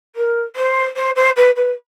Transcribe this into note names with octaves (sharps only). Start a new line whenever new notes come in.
A#4
C5
C5
C5
B4
B4